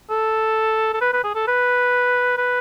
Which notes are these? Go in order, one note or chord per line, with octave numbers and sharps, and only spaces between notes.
A4
A4
B4
B4
G#4
A4
B4
B4